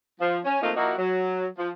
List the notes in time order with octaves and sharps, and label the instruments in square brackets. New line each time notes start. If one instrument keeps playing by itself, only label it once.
[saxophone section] F3
C#4
F3 A3 A#3 C4 D#4 F4
F3 A#3 D#4 E4 F#4
F#3
F3